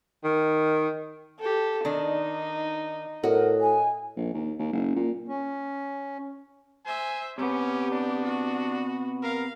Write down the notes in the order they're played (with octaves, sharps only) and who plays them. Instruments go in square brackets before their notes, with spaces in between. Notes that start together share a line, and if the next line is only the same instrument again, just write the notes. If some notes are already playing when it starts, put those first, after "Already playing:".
[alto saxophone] D#3
[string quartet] G4 A4
[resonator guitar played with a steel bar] D#3 D4 [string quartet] D#4
[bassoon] A2 [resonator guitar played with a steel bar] F#4 D#5 [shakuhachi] A#4
[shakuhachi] G#5
[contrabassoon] A#1
D#2
D#2
F#1
A#2
[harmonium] C#4
[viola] C5 E5 [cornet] G#5
[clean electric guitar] C3 B3 [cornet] C#4 [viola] G4
[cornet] D4
[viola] F#4
[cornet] A#4 [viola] F5